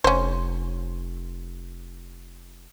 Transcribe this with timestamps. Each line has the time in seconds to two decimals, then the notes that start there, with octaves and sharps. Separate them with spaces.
0.04 F1 C#4 C5